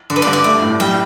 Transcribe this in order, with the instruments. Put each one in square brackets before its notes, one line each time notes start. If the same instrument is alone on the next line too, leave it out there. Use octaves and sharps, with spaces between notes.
[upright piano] D3 [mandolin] D5
[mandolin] B4
D5
[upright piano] G2
[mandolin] D5
[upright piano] A3 [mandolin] D5
[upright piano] A2
[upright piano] G3 [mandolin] G5